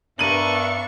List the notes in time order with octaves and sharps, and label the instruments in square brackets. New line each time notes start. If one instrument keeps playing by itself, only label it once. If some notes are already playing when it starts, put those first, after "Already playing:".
[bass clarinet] G2 [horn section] B3 A#4 E5 [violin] D4 C#6 [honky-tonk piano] D#7 F#7